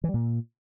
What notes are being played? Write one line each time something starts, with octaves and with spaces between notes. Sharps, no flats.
E3
G3
A#2